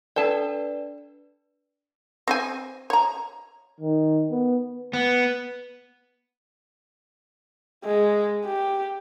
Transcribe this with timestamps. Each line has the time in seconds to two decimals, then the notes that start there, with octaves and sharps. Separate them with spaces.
0.16 D4 A4 B4 D5 A5
2.28 C4 C5 G#5
2.90 C#5 A#5
3.80 D#3
4.31 B3
4.93 B3
7.85 G#3
8.45 G4